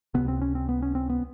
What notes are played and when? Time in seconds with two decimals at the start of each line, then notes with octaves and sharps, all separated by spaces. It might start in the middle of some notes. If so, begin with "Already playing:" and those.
0.14 C#2 C3 B3
0.28 C4
0.41 C#4
0.55 C4
0.69 B3
0.82 C#4
0.95 C4
1.10 B3